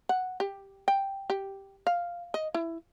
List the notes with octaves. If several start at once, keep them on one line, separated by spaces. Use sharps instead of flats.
F#5
G4
G5
G4
F5
D#5
E4